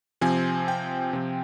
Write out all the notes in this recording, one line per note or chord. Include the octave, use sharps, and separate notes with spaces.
C3 F3 C4 G#5
G5
C3 F3 C4